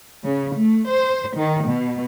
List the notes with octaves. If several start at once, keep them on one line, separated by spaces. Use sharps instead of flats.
C#3
A3
C5
D#3
B2